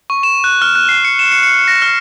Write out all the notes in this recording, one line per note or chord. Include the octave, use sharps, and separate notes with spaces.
C#6
E7
F#6
F6
F#6
C7
C#7
E7
C#7
C#7
A#6
F6